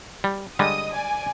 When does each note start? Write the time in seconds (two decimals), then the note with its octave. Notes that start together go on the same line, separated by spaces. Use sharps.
0.24 G3
0.59 D3 G3 G#3 D#5 D#6
0.94 D5 G#5